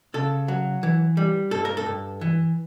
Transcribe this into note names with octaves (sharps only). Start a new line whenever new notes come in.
C#3 A4
F#3
E3
G3
G2 A4
A#4
A4
G2
E3